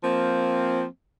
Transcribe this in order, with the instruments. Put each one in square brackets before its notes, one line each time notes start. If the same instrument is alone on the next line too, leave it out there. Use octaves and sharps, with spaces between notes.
[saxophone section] F3 A#3 C4